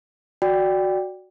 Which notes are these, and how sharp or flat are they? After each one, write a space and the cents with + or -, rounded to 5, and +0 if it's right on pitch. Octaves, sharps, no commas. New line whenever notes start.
F#4 +0 D5 +0 G5 +10